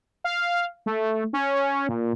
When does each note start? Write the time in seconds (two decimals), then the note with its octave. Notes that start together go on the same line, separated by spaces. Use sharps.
0.24 F5
0.86 A3
1.33 C#4
1.89 A#2